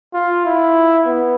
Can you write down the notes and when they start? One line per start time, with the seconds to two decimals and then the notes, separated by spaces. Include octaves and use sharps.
0.13 F4
0.45 E4
1.06 B3